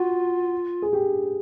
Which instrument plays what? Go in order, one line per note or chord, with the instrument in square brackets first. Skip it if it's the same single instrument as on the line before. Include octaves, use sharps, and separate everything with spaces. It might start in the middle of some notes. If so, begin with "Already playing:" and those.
Already playing: [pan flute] F4 [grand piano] F#4
[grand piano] G#4
G4